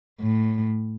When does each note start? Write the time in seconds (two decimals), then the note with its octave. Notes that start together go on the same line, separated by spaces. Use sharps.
0.21 A2